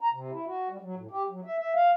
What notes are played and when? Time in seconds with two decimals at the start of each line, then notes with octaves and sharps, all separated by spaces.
0.01 A#5
0.12 C3
0.31 E4
0.46 F#4
0.69 G3
0.81 F#3
0.96 A2
1.11 G4
1.30 F#3
1.45 E5
1.59 E5
1.75 F5